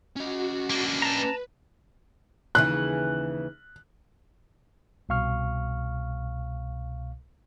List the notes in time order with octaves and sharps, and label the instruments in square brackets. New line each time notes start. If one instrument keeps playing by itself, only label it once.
[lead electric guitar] C#4 D#5 [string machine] F#4
[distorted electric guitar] A#3 D4
[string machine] B4 [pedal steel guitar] A5 A#5
[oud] D#2 C#3 E3 [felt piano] F#6
[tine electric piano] C2 B2 F5 C#6 F6